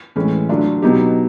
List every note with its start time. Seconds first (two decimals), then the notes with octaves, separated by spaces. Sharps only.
0.16 A2 E3 G#3 C#4
0.49 D3 F#3 A3 D4 F4
0.82 B2 F#3 B3 D#4 G4